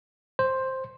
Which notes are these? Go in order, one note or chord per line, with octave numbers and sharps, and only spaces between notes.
C5